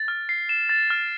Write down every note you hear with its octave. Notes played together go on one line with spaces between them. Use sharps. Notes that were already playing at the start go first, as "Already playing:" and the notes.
Already playing: A6
F6
C7
E7
A6
F6